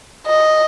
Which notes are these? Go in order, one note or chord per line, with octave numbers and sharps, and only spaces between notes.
D#5